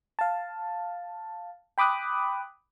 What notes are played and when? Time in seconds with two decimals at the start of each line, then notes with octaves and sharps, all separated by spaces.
0.19 F5 A5
1.78 G5 B5 D6 D#6 F#6